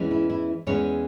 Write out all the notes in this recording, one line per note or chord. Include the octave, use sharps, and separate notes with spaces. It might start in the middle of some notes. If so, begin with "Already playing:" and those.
Already playing: E2 E3 G#3 C#4
E4
E4
E2 E3 G#3 C#4 C#5